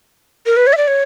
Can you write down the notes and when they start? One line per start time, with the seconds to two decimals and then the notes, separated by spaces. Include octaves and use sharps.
0.46 A#4
0.56 B4
0.67 C#5
0.73 E5
0.77 D5
0.87 C#5